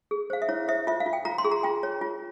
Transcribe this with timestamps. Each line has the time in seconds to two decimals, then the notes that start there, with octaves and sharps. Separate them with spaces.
0.11 G#4
0.30 C5 F5
0.42 E5
0.49 E4 C#5
0.68 C5 E5
0.87 F4 E5
1.00 F5
1.06 F4
1.13 G5
1.25 F4 A#5
1.38 C6
1.45 G#4
1.51 A#5
1.63 F4 G5
1.83 C#5
2.01 F4